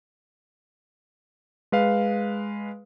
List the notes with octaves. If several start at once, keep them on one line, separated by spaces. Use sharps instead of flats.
G#3 B4 F5